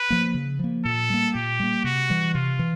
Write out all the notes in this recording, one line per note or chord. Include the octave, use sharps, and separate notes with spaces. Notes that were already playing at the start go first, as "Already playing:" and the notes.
Already playing: B4
F3 A#3
C#3
F3 A#3
A#2 A4
G3 A#3
A#2 G4
G3 A#3
C3 F#4
E3 G3
C3 F4
E3